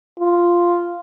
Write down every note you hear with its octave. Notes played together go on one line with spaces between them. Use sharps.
F4